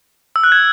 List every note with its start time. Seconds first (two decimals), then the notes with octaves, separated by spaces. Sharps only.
0.36 E6
0.44 F#6
0.52 G#6